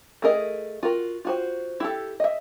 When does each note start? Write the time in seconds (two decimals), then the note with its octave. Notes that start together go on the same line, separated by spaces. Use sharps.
0.22 A3 E4 G#4 A#4 D#5
0.83 F4 F#4 A#4
1.25 F4 F#4 C5
1.80 E4 G4 A4
2.20 D#5 E5